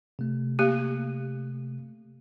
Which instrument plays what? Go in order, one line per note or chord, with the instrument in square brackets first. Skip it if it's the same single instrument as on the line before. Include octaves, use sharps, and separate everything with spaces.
[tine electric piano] C3 A3
[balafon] A#3 G4